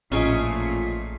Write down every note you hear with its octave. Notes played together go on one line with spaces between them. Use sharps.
A1 A#2 F3 A3 C#4 G#4 D#5 D7